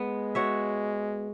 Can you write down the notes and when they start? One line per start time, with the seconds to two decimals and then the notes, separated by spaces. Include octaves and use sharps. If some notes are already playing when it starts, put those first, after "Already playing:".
Already playing: G#3 B3
0.35 F#4 C#5 E5